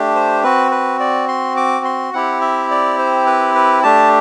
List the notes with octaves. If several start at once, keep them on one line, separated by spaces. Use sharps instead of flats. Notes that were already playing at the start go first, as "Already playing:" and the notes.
Already playing: A3 D4 G4
C5
C4 F#4 B4
B4
D5
C6
D6
C6
C4 E4 G4 F#5
E5
D5
C5
B4
B4
A3 D4 G4 A5